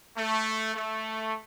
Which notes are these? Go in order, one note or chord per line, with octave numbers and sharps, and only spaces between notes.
A3
A3